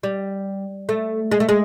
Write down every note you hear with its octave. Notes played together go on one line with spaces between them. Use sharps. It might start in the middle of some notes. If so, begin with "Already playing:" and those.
G3
A3
G#3
A3
G#3